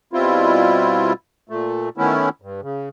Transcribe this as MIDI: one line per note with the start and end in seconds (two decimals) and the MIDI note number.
0.13 1.13 47
0.13 1.13 55
0.13 1.13 60
0.13 1.13 64
0.13 1.13 65
1.49 1.89 46
1.49 1.89 57
1.98 2.29 51
1.98 2.29 52
1.98 2.29 57
1.98 2.29 59
1.98 2.29 61
1.98 2.29 64
2.42 2.61 43
2.62 2.89 49